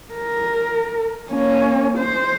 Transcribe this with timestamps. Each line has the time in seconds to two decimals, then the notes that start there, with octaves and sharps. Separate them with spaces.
0.14 A#4
1.30 A#3 C#4
1.98 C5